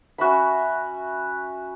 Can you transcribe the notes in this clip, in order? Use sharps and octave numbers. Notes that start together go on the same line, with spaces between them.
C#4 F#4 E5 B5